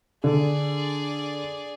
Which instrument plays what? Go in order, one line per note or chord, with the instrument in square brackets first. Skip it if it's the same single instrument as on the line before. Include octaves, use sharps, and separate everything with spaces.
[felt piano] D3 [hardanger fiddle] G#4 D5